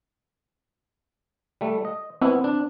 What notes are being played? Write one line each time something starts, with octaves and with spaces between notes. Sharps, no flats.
G3 A3
D#5
B3 C4 E4
D4